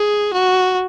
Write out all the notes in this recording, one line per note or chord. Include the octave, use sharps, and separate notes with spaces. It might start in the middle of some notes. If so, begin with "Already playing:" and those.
Already playing: G#4
F#4